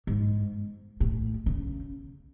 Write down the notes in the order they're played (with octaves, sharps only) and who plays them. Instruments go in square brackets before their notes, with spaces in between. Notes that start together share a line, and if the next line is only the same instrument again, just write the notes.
[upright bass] G#2
A2
C#3